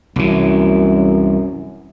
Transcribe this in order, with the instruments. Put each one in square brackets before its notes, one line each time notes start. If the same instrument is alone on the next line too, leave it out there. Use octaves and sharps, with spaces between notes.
[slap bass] C2 E3 [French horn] F#2